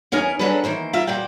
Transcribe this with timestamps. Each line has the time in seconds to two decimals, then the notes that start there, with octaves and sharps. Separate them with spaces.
0.12 E2 C#4 D#4 A#4 B4 G#5
0.39 F#3 C#4 D4 G#4 A4 B4
0.64 D#3 E3 A#3 C5
0.93 F4 A#4 E5
1.07 E2 A#2 F#4 D5 G5